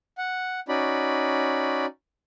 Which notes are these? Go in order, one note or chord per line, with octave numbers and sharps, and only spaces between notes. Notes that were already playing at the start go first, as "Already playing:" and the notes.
F#5
C#4 D#4 F#4 D5 B5